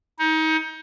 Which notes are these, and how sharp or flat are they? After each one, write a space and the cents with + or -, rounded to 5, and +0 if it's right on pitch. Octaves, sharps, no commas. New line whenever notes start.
D#4 +30